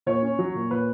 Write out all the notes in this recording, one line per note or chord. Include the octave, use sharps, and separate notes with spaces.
A#2 C#5
C#4
F#3
A#2
A#2 B4